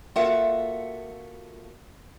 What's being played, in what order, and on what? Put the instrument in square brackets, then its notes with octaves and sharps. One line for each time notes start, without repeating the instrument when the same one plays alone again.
[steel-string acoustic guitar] A#3 F4 F#4 A4 E5 F#5